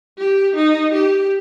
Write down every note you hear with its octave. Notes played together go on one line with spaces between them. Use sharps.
G4
D#4
G4